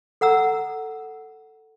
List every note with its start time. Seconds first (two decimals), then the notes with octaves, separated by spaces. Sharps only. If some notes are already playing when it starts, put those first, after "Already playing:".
0.21 A4 F#5 A#5 E6